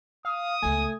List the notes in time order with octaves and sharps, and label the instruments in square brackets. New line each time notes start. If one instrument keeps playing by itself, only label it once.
[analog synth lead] F5 [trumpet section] D#6
[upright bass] C#2 B3 [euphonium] A3 [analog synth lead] G#5